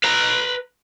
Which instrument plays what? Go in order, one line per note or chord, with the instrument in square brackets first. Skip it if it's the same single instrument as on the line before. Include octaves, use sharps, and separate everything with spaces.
[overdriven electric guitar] B4 A#5